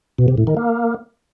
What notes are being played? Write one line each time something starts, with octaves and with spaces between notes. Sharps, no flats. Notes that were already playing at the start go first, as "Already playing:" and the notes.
B2
C3
A2
D#3
A#3